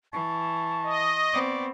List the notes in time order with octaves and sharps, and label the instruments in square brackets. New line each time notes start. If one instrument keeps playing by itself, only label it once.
[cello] E3 [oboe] A5 [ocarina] C#6
[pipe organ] D#5
[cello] B3 C4 [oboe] D5